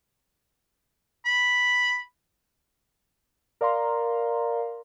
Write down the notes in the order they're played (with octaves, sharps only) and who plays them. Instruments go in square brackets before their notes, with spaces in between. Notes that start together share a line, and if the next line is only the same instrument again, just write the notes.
[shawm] B5
[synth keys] A#4 D5 F5 A#5 C6